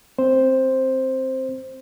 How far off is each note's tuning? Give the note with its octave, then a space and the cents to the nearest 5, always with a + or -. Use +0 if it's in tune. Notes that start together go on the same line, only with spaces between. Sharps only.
C4 +5 C5 +5